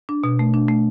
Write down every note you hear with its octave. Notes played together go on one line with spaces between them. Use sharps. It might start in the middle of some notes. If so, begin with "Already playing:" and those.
D4
B2
A3
D4
A3